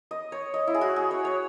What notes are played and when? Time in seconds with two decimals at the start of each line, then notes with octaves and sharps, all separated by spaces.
0.11 D#5
0.32 C#5
0.54 D#5
0.67 E4
0.74 G#4
0.81 F#4
0.96 G#4
1.11 C#5
1.25 C#5